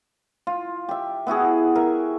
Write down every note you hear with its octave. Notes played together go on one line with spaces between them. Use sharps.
F4
G4 E5
B3 E4 F#4 G#4
A#4 E5